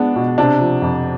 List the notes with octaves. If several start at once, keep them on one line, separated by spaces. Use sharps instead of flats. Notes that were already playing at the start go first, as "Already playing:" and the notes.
Already playing: G#3 B3 D4
B2
C3 D4
F3
F2